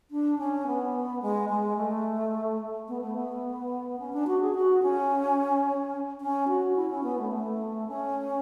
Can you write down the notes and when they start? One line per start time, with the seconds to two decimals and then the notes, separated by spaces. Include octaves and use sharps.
0.11 D4
0.38 C#4
0.67 B3
1.22 G#3
1.49 G#3
1.77 A3
2.88 B3
3.01 A3
3.15 B3
3.99 C#4
4.13 D4
4.27 F#4
4.41 G#4
4.55 F#4
4.82 C#4
6.21 C#4
6.48 F#4
6.76 E4
6.90 C#4
7.03 B3
7.18 A3
7.32 A3
7.88 C#4